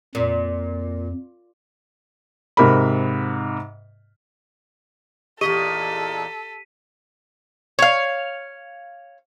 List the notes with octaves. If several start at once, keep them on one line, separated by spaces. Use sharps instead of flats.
F2 A#2
G#2 C3 A#4 B5
E2 A#2 G4 A4 D#5 B6 D#7
C#5 F5